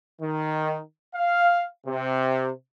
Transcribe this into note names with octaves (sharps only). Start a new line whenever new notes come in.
D#3
F5
C3